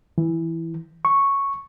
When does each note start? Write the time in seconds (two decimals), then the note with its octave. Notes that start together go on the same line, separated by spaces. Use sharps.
0.18 E3
1.05 C#6